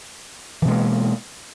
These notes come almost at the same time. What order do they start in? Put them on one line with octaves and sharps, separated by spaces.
E3 B2 G#3 A#3